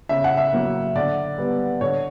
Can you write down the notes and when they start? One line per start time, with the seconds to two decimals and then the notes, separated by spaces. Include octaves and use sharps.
0.09 C#3 E5
0.24 F#5
0.37 E5
0.53 F#3 A#3
0.95 D3 D5
1.38 G3 B3
1.81 D3 C#5